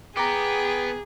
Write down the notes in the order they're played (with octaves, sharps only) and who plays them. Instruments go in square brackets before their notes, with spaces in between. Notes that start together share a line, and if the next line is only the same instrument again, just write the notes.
[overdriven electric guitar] B3 [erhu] G#4 [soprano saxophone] G5 [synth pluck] A#5 D6